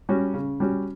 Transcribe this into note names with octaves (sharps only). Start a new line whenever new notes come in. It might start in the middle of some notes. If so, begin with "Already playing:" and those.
G3 C#4 F#4
C#3
G3 C#4 F#4